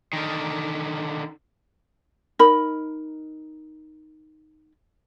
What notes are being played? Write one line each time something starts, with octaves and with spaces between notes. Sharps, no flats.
D3 D#3
D#4 A#4 B5